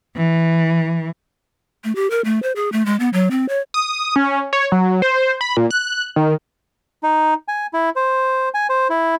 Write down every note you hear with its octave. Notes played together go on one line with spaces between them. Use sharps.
E3
A3
G4
A#4
A3
C5
G#4
A3
G#3
B3
F#3
C4
C#5
D#6
C#4
C#5
F#3
C5
B5
A#2
F#6
D#3
D#4
G#5
E4
C5
G#5
C5
E4